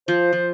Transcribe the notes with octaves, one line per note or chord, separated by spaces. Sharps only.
F3 C5
F3